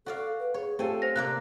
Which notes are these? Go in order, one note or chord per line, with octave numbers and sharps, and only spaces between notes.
F#4 A4 D5 F5
B4
G#4 C#5
A3 C4 F4 G4 A4 G#5
C5 A#6
C3 A#3 D5 F#6